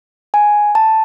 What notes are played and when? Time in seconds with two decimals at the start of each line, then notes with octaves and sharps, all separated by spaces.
0.34 G#5
0.75 A5